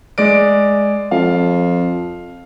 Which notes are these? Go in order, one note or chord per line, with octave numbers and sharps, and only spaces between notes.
G#3 D5 D7
F2 F5